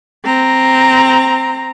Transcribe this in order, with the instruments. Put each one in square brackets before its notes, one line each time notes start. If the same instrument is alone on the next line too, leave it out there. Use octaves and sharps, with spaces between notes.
[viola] C4 A#5